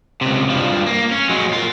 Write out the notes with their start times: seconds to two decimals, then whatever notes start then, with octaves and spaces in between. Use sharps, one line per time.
0.21 C#2 C3
0.49 G2 F3
0.86 A#3
1.11 C#4
1.29 F#3 G#3
1.53 F4 A#4